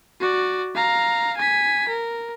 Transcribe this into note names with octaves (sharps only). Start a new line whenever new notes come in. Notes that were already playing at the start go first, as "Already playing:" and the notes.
F#4 D5
F5 A#5
G#5 B6
A#4